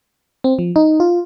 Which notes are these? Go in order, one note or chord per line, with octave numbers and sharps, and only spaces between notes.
C4
F3
D#4
F4